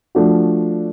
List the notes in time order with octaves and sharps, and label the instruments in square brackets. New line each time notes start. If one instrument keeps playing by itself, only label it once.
[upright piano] F3 A3 D4 F#4